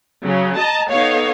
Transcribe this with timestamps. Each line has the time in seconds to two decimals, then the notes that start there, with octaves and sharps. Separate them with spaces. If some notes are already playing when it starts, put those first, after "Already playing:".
0.23 C#3 F#3
0.58 D#5 A5 A#5
0.90 B3 D#4 A4 C#5 F5